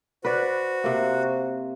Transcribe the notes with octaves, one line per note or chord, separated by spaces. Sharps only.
F#4 B4 C5 D5
C3 A#3